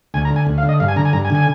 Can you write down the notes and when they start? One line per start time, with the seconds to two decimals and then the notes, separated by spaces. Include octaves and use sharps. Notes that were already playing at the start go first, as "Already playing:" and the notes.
0.14 D2 G#5
0.25 A#5
0.31 D3
0.36 G#5
0.47 D2
0.58 F5
0.63 D3
0.69 D#5
0.80 G2 F5
0.88 G#5
0.96 D3 A#5
1.05 G#5
1.13 G2 A#5
1.25 G#5
1.30 D3
1.35 G#5